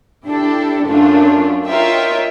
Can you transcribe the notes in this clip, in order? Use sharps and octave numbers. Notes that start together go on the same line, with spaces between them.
D4 E4 G4 A4
F#2 A3 D4 F4
F4 A#4 C#5 D#5 E5 G5